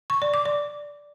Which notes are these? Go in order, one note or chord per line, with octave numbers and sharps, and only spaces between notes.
C#6
D5
D6
D5